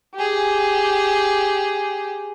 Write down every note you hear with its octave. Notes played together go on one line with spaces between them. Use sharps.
G4 G#4